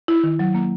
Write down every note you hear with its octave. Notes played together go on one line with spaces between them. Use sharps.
E4
D#3
F#3
A#3